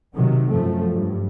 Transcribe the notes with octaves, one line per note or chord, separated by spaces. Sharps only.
C3 D#3 F#3
F#2 F3 A3
G2